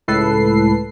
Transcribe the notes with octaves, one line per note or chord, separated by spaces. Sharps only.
C#2 A2 A4 B4 C7